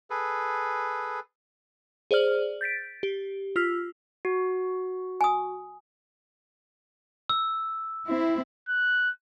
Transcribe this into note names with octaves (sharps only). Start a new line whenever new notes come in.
G#4 A4 B4
G#4 C5 D5 F6 F#7
G6 A6 B6 D7
G4
F4 E6 F6 B6
F#4
G#5 D#6
E6
C4 E4
F#6